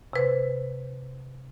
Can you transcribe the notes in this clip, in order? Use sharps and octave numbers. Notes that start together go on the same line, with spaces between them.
C3 B4 C5